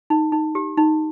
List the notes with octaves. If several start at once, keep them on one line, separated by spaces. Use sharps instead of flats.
D#4
D#4
G4
D#4